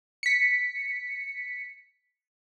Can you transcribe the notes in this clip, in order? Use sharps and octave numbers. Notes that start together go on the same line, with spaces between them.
B6 C#7